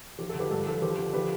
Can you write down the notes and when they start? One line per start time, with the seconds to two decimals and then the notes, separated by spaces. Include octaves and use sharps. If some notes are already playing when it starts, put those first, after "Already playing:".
0.19 F3 G4
0.29 A4
0.35 D3
0.40 G4 B4
0.51 G2 A4
0.66 F3 A4
0.82 F3 G4 B4
0.98 D3
1.13 F3 G4 B4